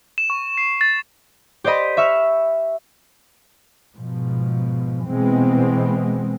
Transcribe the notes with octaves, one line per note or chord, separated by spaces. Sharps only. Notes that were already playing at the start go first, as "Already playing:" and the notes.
E7
C#6
C7
A6
G4 C5 D5 D#5 B5
E5 C#6 E6 F6
G#2 B2 F3
B2 E3 G#3 B3 C4